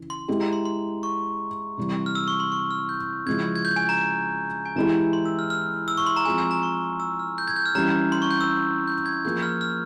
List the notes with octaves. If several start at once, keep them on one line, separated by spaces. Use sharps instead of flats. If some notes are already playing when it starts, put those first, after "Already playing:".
Already playing: C#3 E3
C6
G#3 E4 G4
A#5
C6
C6
C#6
C3 E3 G3
F6
E6
C#6
C6
C#6
F6
G6
C#3 F3 G#3 C#4 E4 G#6
G#6
G6
G#5
A#5
G#5
E3 G#3 E4 G4 A#5
C6
E6
F6
F6
E6
C#6
C6
A#5
F3 G#3 C4 F4 G#4 G#5
G#5
A#5
C#6
E6
F6
G6
G#6
G6
F6
E3 G3 C#4 G4 A#5
C6
C#6
G6
E6
G6
G#6
F3 A#3 F4 G#4 G6
F6
F6